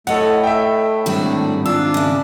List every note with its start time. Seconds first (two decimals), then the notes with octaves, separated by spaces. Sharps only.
0.07 A2 A3 A4 C#5 D#5 F#5
0.43 E5 G5
1.06 D#3 G3 G#3 C4 D4 F#4
1.66 D4 F4 E6
1.94 C#3 E4